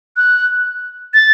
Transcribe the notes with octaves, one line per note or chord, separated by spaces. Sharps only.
F#6
A6